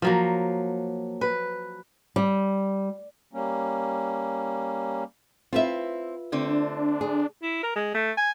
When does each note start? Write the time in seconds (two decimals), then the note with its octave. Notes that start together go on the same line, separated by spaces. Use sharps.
0.02 F3 F#3 A#3
1.21 B4
2.16 G3
3.33 G3 A#3 C#4
5.53 C4 E4 F4 B4 E5
6.32 D3 A3 C4 D4
7.01 G#4
7.42 E4
7.63 A#4
7.76 G#3
7.94 A3
8.17 G#5